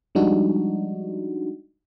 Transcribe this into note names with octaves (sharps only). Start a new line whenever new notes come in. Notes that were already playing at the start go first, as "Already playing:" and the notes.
F3 G3 G#3 D4 D#4 F#4